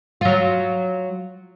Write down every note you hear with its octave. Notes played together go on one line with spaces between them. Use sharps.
F#3 F4